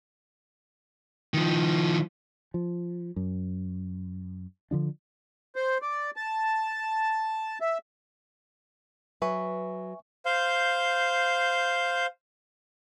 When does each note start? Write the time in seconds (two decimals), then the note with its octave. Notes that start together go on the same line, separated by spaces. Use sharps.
1.34 D#3 F3
2.54 F3
3.16 F#2
4.71 D3 F3 D4
5.56 C5
5.82 D5
6.16 A5
7.61 E5
9.22 F#3 B4 E5 G#5 C#6
10.26 C5 F5 G6